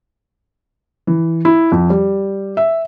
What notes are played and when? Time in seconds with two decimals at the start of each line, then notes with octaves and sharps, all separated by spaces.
1.07 E3
1.45 E4
1.72 F2
1.90 G3
2.57 E5